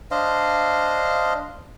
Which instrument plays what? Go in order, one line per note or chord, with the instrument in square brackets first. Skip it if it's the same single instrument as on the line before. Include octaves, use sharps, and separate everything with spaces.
[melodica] D4 C5 D#5 F5